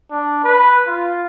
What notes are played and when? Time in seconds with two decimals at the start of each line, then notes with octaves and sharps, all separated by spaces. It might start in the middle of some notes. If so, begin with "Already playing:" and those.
0.11 D4
0.44 B4
0.87 F4